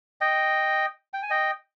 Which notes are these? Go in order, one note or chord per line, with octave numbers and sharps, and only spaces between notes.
D#5 G5
G5
G#5
D#5 G5